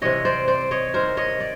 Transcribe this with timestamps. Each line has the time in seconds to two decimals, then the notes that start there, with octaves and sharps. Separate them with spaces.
0.01 C3 E3 G3 C#5 D#5
0.25 C5 D5
0.48 C5 D5
0.71 C#5 D#5
0.94 C3 D#3 G3 A#4 C5
1.17 C#5 D#5
1.40 D5